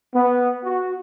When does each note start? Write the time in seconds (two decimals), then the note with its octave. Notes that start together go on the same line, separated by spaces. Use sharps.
0.14 B3
0.64 F#4